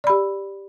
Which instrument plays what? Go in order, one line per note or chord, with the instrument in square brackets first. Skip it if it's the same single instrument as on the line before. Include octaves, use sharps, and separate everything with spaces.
[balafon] D5
B5
G4